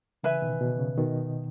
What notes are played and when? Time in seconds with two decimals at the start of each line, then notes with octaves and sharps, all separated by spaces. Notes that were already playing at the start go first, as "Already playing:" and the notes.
0.24 C#3 E3 B4 E5 G#5
0.42 B2 D#3
0.60 B2
0.79 C#3
0.98 B2 D#3